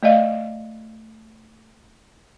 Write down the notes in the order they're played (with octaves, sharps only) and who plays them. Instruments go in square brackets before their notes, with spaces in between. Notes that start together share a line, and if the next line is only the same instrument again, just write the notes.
[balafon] A3 D5 D#5 F5